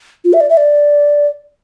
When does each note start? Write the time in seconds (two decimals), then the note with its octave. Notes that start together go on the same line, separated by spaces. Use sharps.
0.25 F4
0.33 E5
0.41 D5
0.50 E5
0.57 D5